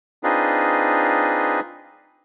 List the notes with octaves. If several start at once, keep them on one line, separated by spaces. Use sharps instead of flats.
C4 D4 D#4 F4 G#4 B4